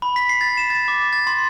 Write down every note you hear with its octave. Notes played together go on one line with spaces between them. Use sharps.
B5
B6
C7
A6
E7
A6
D6
A6
C6